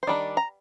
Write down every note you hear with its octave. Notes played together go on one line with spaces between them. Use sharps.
C5
D#3 G3 D4 D5
A#5